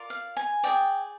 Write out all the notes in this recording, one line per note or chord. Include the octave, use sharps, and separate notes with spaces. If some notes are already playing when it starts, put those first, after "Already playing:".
Already playing: F4 A#4 D5
F5
G#5
G#4 D5 G5